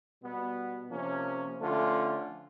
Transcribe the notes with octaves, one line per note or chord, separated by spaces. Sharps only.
B2 G3 B3
C3 F3 A#3 C#4
D3 F3 A3 C#4 F4